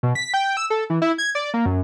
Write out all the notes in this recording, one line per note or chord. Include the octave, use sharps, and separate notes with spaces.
B2
B6
G5
E6
A4
E3
E4
G#6
D5
A#3
F#2